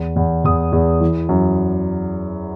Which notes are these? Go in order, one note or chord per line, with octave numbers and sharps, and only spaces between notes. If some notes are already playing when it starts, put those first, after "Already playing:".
Already playing: E2
E2
E2 D#6
E2
E3
F#2